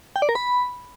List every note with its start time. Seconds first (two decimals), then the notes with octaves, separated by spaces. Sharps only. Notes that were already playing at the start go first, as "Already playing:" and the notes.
0.16 G5
0.22 D5
0.29 A#4
0.35 B5